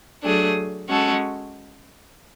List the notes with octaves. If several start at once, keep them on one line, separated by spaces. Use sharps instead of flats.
F#3 A3 D4 G#4
G#3 C#4 F#4 A4